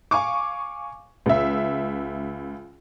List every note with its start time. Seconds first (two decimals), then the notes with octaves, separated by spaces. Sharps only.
0.11 F5 G#5 C#6 D6
1.26 C#2 E5